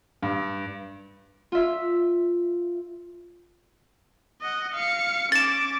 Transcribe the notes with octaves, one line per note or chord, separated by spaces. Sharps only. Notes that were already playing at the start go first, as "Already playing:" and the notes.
G2
F4 E5
D#5 F#5
F5 C#7
C#4 D6 A6 E7